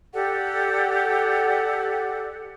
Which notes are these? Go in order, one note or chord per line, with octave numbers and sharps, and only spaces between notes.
G4 A4 D5 F#5